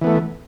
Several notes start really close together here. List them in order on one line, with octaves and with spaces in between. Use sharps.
E3 B3 A3